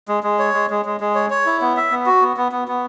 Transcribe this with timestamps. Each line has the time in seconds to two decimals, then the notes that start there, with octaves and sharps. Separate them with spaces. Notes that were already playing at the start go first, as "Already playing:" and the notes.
0.08 G#3
0.23 G#3
0.39 C#5
0.54 G#3
0.70 G#3
0.85 G#3
1.00 G#3
1.15 C#5
1.30 C#5
1.46 E4
1.61 B3
1.77 E5
1.91 B3
2.06 F#4
2.21 B3
2.37 B3
2.52 B3
2.68 B3